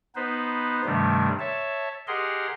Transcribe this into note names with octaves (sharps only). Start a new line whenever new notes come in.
B3 D#4 B4 C5
G2 C3 D#3 G3 A3
C#5 E5 A5
G4 G#4 A#4 D#5 F#5 C6